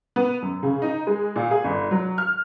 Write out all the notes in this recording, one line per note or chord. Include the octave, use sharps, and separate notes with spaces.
B3
F#2
C#3
D#4
G#3
A#2
G#4
G1
F#3
F6